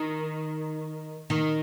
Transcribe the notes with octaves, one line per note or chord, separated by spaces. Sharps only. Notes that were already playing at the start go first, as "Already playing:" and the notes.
Already playing: D#3
D#3